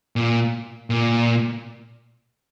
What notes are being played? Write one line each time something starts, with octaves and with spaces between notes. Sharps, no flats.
A#2
A#2